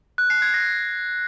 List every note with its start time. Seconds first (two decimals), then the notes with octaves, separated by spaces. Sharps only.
0.18 F#6
0.30 C7
0.42 G#6
0.54 A#6